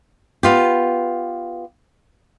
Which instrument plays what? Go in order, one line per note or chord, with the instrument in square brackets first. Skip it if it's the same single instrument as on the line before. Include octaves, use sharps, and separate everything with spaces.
[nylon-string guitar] B3 F4 G4